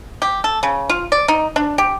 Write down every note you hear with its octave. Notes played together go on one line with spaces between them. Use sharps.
G4
A4
C#3
F4
D5
D#4
D4
G4